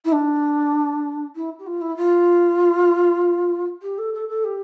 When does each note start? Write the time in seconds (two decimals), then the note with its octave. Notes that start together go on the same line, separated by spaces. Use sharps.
0.04 E4
0.12 D4
1.35 E4
1.58 G4
1.66 F4
1.81 E4
1.96 F4
3.82 G4
3.97 A4
4.13 A4
4.28 A4
4.44 G4